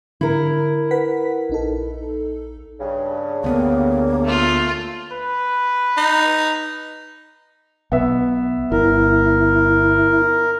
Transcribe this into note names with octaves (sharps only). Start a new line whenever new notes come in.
D3 E4 A#4
B4 F#5 B6
A#1 D#4 A4
G2 C#3
D2 A#3 B3
A3 F4
B4
D#4
B1 B3 E5
G1 E4 A#4